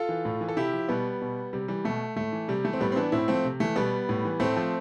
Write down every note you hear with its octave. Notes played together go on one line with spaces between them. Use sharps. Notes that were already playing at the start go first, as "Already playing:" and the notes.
Already playing: F4 A4
E3
A2
E3
A4
C3 E4 G4
F3
B2 G3 B3
B2
C3 G3
E3 G3
B2 A3
A2 A3
E3
C3 G3
E3 A3
C4
A2 G3 B3
C4
E3 B3 D4
A2 C4 E4
F3 A3 C4
C3
E3 A3
B2 G3 B3
A2
E3
A2 A3 C4
F3